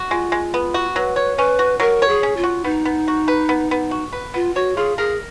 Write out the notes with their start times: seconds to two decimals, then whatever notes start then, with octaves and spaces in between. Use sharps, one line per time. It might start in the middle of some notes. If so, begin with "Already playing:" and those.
Already playing: F#4
0.10 G#3 F4
0.32 G#3
0.54 B3
0.74 F#4
0.95 F#3 B4
1.16 C#5
1.37 C#4 B4
1.59 F#4
1.80 F#3 A#4
2.02 C#5
2.08 G#4
2.23 C#4
2.37 F4
2.44 F#4
2.64 B3 D#4
2.85 B3
3.08 F#4
3.28 B4
3.49 B3
3.71 B3
3.91 F#4
4.13 B4
4.34 B3 F4
4.55 F#4 C#5
4.77 F4 G#4
4.98 G#4 A#4